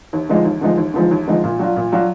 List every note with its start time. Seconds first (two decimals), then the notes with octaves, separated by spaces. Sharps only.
0.13 D#2
0.29 D3 F3 G#3 D#4
0.45 D#2
0.61 D3 F3 G#3 D#4
0.78 D#2
0.94 D3 F3 G#3 D#4
1.11 D#2
1.27 D3 F3 G#3 D#4
1.44 A#2
1.59 F#3 D4 F4
1.76 A#2
1.92 F#3 D4 F4